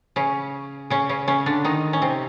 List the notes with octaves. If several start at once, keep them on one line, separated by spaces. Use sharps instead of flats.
C#3 C#4
C#3 C#4
C#3 C#4
C#3 C#4
D3 D4
D#3 D#4
C#4
C3 C4